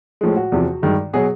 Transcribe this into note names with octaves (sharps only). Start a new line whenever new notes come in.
A2 F3 G#3
F#4
E2 C3 F3
G2 D#3 G#3
B2 F#3 G#4